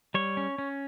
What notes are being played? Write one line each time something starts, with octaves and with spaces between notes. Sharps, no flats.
G3 C#5
C#4
C#4